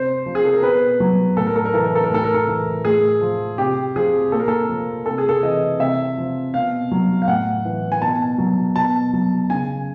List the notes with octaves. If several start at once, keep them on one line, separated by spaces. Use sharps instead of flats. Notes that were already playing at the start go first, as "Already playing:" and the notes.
Already playing: C3 C5
F3
G#4
A4
A#4
B2 B4
F#3
A2 A4
A#4
A4
A#4
E3 A4
A#4
A4
A#4
A2 A4
A#4
A4
E3
A2 G#4
F3
C3 G4
F3 G#4
A#2 A4
A#4
A4
F3
C3 A4
G#4
A4
E3 D#5
C3 E5
F3
B2 F5
F#3
F5
A2 F#5
E3
G#5
B2 A5
F#3
B2 A5
F#3
C#3 G#5